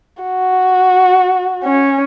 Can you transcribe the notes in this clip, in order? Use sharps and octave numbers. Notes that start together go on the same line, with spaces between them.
F#4
C#4